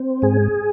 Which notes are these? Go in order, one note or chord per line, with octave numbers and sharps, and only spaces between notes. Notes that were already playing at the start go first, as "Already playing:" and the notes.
Already playing: C4
G#2 G#4